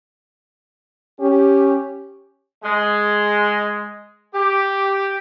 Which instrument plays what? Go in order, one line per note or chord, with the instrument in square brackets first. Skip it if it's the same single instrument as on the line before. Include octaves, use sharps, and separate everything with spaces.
[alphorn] C#4 [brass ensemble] G4
[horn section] G#3
G4